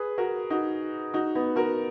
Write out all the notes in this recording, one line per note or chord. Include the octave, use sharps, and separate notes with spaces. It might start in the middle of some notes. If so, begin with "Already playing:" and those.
Already playing: G#4 B4
F#4 A#4
D#4 F#4
D#4 F#4
B3 D#4
F#4 A#4